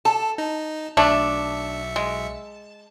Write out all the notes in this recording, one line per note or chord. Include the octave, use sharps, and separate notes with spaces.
A4 A5
D#4
B1 A3 D4 E5 C#7
G#3